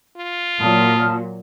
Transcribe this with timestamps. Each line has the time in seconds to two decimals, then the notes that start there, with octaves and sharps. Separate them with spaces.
0.17 F4
0.60 A#2 F#3 A5 D#6 F6